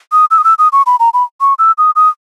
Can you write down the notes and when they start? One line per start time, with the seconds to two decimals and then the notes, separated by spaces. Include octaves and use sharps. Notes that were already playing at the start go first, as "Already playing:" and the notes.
0.12 D#6
0.31 E6
0.38 D#6
0.44 E6
0.59 D#6
0.73 C#6
0.86 B5
1.00 A#5
1.14 B5
1.41 C#6
1.59 E6
1.78 D#6
1.96 D#6